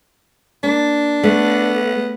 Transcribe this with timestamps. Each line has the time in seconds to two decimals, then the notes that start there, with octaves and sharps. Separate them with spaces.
0.63 A#3 D4
1.23 A3 B3